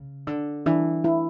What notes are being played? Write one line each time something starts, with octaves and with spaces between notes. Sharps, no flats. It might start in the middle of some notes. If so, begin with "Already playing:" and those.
Already playing: C#3
D3
E3 D4
E4